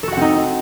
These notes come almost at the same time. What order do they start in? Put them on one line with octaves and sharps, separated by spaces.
A4 F#4 F#5 C4 D#4